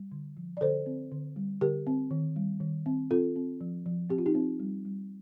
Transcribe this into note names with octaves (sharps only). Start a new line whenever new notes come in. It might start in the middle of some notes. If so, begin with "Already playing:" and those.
Already playing: G3
D3
F3
D5
D3 A4 C5
C4
D3
G3
D3 G4 A#4
C4
D#3
G3
D#3
C4
C4 F4 A4
C4
F3
F3
C4 G4
F4
D#4 G4
C4
G3
G3